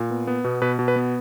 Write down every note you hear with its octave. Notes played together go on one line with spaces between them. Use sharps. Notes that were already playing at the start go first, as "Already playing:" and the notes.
Already playing: A#2
B3
B3
B2
B2 B4
B2
B4
B3